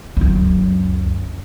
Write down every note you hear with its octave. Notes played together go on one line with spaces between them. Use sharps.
C#2 F#2